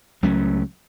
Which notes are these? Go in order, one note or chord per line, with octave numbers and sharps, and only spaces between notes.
C#2 F#3 A3 C#4